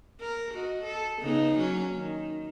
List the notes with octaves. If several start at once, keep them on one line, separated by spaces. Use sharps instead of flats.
A#4
F#4 D#5
A4
C#3 B3 D#4
F#3 A#3 C#4
D#3